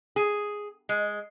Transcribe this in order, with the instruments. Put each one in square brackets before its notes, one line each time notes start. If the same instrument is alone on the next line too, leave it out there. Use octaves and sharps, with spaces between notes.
[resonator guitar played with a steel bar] G#4
G#3